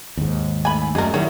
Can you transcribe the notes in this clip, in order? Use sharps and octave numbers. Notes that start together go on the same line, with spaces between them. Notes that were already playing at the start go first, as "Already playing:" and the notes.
D#2 G#2
E2 A3 G#5 B5
F#2 A3 G#4 A#4 D5 D#5
D#3 F#3 G3 D#4 E4 G#4 C#5